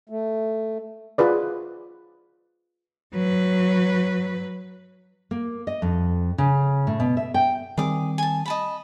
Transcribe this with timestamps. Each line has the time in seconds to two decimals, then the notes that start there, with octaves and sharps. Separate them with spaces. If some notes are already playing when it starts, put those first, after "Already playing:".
0.09 A3
1.18 F4 G#4 B4 D5
3.13 F#3 B4
5.31 A#3
5.67 D#5
5.82 F2
6.38 C#3
6.87 A2
7.00 B2
7.17 E5
7.34 G5
7.78 D#3 G3 C4 G#4 D6
8.18 G#5 A5
8.46 D#5 A5 B5